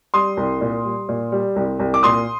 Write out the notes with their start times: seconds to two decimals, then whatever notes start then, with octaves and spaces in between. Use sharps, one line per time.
0.14 G3 C6 D#6
0.37 C2
0.61 A#2
0.85 G3
1.09 A#2
1.32 G3
1.56 C2
1.79 C2
1.94 D6
2.03 A#2 C6 D#6